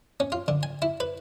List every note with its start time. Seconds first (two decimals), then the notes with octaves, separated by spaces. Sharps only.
0.20 C#4
0.32 F4
0.48 D3
0.63 G#5
0.82 E4
1.00 B4